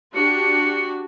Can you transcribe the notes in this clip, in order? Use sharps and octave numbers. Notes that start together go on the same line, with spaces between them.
D4 F#4 G4 C#7